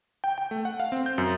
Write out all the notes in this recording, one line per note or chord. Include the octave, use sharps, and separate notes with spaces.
G5
G5
A3
F#5
F5
C4
G6
F#2